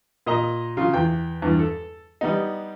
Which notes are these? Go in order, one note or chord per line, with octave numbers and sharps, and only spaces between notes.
A#2 D#5 A#5
C#3 F#3 F4
E2 G5
E2 G2
A4
G3 B3 D#4